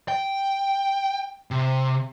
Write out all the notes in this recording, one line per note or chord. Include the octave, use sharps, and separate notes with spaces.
G5
C3